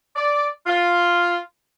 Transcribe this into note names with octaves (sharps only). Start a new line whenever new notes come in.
D5
F4